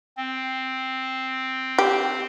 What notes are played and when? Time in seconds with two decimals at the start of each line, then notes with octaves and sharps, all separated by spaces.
0.17 C4
1.78 G4